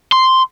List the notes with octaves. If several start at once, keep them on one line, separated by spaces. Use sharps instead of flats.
C6